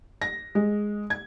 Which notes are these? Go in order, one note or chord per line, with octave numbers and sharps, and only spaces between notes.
A#6
G#3
G#6